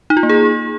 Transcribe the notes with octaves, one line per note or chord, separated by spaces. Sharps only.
D#4
F4
A#3
G#4